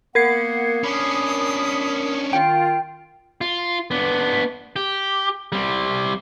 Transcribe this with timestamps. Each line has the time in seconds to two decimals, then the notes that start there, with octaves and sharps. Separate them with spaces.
0.15 A#3 B3 A#4 F#5 G#6 C7
0.83 C#4 D4 B5 D#6
2.33 D#3 F4 G5
3.41 F4
3.91 B3 D4
4.76 G4
5.52 G3 C4